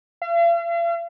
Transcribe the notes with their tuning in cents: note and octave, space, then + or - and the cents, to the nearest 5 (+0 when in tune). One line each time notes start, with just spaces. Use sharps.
F5 -45